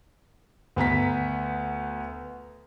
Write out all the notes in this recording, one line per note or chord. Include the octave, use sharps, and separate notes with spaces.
D2 B3 A#5 B6